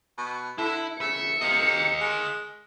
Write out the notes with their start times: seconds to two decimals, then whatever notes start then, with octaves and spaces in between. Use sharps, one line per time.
0.18 B2
0.58 D3 E4
1.01 C#3 E5 C#7
1.41 C3 D#5 F5
2.01 G#3